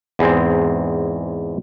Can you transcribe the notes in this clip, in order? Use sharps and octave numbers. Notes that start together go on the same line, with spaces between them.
E2 G#2 G#3 C4